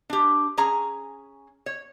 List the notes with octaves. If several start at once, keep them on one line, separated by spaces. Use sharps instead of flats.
D4 G4
C#4 G#4 G#5 A#5
C#5